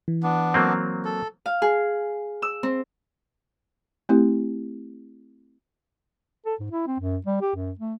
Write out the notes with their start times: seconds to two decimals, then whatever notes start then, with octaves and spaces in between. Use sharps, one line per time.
0.08 E3
0.23 B3 D4
0.54 F#3 A#3 C4
1.05 A4
1.46 F5
1.62 G#4
2.42 E6
2.63 C4
4.09 A3 C4 E4 G4
6.46 A4
6.60 G#2
6.71 E4
6.87 C4
7.00 F#2
7.26 G3
7.41 G4
7.55 F#2
7.79 A3